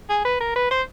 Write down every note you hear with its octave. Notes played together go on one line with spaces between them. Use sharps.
G#4
B4
A#4
B4
C5